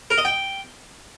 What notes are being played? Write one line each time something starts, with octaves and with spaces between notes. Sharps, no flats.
A#4
D#5
G5